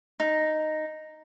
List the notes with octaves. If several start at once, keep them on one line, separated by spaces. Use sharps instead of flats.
D#4